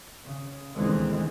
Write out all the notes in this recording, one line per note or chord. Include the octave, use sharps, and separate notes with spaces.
C#3
D2 B2 D#3 E3 G#3 C4